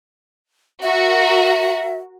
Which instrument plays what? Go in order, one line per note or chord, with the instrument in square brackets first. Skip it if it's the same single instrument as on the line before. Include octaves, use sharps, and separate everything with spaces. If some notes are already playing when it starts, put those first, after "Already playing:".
[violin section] F#4 A#4 [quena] E5